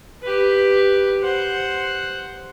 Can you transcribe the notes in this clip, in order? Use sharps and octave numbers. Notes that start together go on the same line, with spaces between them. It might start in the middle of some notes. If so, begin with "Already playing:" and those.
G4 B4
C5 F#5